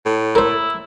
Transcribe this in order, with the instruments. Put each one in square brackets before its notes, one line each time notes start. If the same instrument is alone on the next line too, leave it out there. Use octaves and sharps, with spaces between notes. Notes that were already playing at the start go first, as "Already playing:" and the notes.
[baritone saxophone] A2
[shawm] E4 [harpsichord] A#4 C5